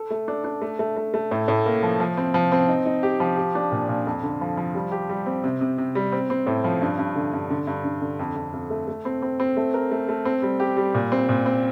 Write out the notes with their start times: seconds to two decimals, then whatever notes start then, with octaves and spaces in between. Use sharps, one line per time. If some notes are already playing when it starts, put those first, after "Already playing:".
Already playing: A4
0.10 A3
0.28 D4
0.44 D4
0.62 A3
0.79 A3
0.97 A3
1.14 A3
1.31 A2
1.48 A2
1.66 A#3
1.83 F3
2.00 F3
2.17 C4
2.34 F3
2.52 C4
2.68 D#4
2.86 D#4
3.03 G4
3.20 F3
3.37 G4
3.55 D4
3.72 A#2
3.89 A#2
4.07 F2
4.23 D3
4.41 F3
4.57 F3
4.75 G3
4.92 G4
5.10 G3
5.26 C4
5.44 C3
5.61 C3
5.78 C3
5.95 G3
6.12 C4
6.30 C4
6.47 A2
6.64 F3
6.82 G2
6.99 G2
7.16 D3
7.33 G2
7.50 D3
7.67 G2
7.85 D3
8.02 D3
8.19 F2
8.36 F2
8.53 F2
8.70 A3
8.88 A3
9.05 C4
9.22 C4
9.40 C4
9.57 A3
9.74 A#4
9.91 A3
10.09 A3
10.25 C4
10.43 G3
10.60 G4
10.77 G3
10.94 A#2
11.12 C4
11.29 A#2
11.46 C4